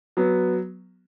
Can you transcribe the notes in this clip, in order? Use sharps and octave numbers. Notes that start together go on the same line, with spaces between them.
F#3 B3